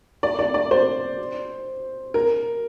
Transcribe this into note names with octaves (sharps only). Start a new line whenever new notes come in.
D5
D5
D5
C5
A#4